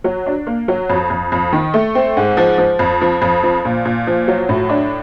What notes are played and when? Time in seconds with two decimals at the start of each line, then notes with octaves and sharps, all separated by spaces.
0.04 F#3
0.26 D4
0.47 A#3
0.68 F#3
0.90 F2
1.10 F2
1.32 F2
1.53 D#3
1.74 A3
1.95 C4
2.17 G#2
2.37 F3
2.58 F3
2.79 F2
3.01 F3
3.22 F2
3.43 F3
3.65 A#2
3.85 A#2
4.07 F3
4.28 F#3
4.49 A2
4.69 D4